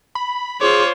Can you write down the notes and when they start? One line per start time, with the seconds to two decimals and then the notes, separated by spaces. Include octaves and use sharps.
0.15 B5
0.61 F4 G#4 C5 C#5 D6